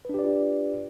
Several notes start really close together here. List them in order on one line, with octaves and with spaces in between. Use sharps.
B4 D4 G4 D5 F4